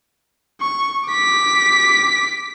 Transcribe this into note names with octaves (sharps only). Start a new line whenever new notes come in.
C#6
D6 B6